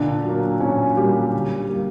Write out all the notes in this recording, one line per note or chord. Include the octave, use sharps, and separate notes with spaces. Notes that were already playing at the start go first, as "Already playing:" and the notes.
Already playing: A#2 D3 D4
F#3 A#3
A#2 C#4
F#3 G3 A#3 G4
D3
G3 A#3